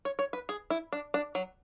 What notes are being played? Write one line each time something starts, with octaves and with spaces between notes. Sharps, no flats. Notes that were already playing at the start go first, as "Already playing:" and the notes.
C#5
C#5
B4
G#4
E4
D4
D4
F#3